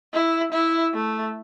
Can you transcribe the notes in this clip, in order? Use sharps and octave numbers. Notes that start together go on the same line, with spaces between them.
E4
E4
A3